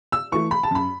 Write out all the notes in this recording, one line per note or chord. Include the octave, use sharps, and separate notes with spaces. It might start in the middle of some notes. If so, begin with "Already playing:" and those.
E6
E3 A3 C#6
B5
A5
F#2 B5